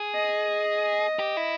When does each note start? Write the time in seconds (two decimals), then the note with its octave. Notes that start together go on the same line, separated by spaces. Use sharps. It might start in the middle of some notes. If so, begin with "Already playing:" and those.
Already playing: G#4
0.15 D#5
1.19 G4
1.37 E4